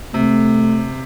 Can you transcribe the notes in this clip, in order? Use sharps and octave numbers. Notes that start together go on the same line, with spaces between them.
C3 A3